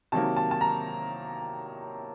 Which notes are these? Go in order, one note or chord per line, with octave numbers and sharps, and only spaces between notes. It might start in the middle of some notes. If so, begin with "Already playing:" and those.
C3 D#3 F#3 A#3 A5
A5
A5
A#5